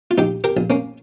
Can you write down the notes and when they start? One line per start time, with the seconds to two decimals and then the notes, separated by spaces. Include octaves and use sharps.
0.11 F4
0.18 A#1 D#4 G4
0.44 G4 A#4
0.57 A#1
0.70 A#3 C#4